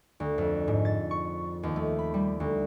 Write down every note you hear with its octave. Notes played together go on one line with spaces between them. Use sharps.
D2
F2
G#2
A6
C#6
D#2
A3
B5
G3
D2